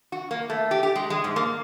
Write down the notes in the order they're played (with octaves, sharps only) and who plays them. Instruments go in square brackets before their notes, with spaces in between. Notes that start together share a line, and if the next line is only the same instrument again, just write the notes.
[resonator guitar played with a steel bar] F#4
A#3
A3
G4
G4
G#3
G#3
G#2
A#3